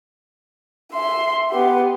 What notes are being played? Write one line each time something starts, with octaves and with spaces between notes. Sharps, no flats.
E5 C6
B3 G4